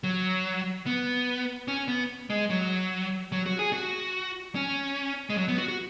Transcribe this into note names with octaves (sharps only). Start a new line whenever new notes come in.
F#3
B3
C#4
B3
G#3
F#3
F#3
F#4
G#4
F#4
C#4
G#3
F#3
B3
F#4
F#4